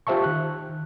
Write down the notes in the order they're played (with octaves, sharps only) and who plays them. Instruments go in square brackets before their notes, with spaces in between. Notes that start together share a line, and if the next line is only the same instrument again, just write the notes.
[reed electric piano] F4 G4 C5 E5 A5 C#6
D#3 F#6